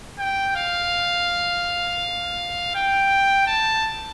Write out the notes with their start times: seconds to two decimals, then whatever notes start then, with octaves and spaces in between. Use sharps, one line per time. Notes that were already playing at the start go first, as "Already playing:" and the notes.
0.19 G5
0.56 F5
2.75 G5
3.47 A5